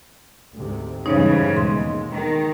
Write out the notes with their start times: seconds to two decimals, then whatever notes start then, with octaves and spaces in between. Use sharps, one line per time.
0.55 D2 G#2 C3
1.06 E2 G2 C#3 E3 G#3 D#4 C5 C#5
1.56 D#2 B2 G#3 C6
2.10 D#3